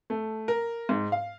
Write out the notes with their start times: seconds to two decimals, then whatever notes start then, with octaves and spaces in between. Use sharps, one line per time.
0.10 A3
0.48 A#4
0.89 G#2
1.12 F5